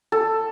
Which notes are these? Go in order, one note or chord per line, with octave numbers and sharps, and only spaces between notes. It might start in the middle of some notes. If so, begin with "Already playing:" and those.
A4